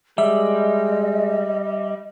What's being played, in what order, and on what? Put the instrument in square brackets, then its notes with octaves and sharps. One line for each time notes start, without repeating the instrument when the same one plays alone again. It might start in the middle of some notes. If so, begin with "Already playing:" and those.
[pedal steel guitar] G3 [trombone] G#3 [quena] D#5 [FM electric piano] E5